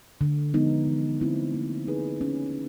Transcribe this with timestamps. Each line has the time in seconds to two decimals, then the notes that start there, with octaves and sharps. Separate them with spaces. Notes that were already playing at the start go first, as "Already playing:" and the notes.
0.21 D3
0.54 F3 G#3 B3 D#4
0.87 E3
1.21 A3 C4 E4
1.54 A#3
1.88 D#4 G#4 B4
2.21 C#4